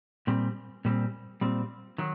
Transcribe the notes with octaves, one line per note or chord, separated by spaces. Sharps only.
A#2 G3 C4
A#2 G3 C4
A#2 G3 C4
D#3 F#3